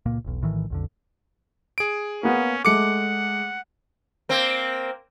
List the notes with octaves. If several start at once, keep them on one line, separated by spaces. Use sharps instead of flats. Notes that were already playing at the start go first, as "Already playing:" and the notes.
C#2 A#2 A#3
E1 B1
A#1 A2 D#3 E3
B1 F2 D3
G#4 D7
A#3 B3 C#4
G#3 A3 F#5 D6 C#7
A#3 C4